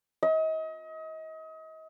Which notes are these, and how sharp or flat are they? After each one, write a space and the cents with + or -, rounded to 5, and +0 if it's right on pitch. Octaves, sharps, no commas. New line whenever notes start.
D#5 +35